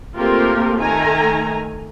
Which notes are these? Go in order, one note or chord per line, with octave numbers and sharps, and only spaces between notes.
A3 A#3 C4 F4 G4 A#4
D#3 A3 G#5 A#5